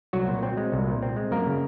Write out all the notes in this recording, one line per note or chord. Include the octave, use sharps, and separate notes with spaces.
C2 F#3 F#4
A#2
C4
G#3
C2
A#2
C4
G#3
F#2 A#3 A#4
C#3